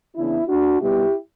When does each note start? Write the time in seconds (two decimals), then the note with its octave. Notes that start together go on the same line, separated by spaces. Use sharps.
0.15 C#3 E3 B3 D4 E4
0.48 D4 F#4
0.80 B2 G3 B3 E4 G4